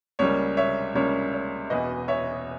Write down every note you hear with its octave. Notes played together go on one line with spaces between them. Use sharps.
C#2 C#3 G3 A#3 C#5
C#5 E5
C#2 C#3 G3 A#3 C#5
C#5
E1 E2 B2 B4 D#5
C#5 E5